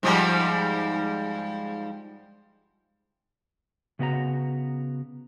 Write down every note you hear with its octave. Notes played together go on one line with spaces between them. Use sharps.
G#2 F3 G3
C#3 B3 F#4 D5 A#5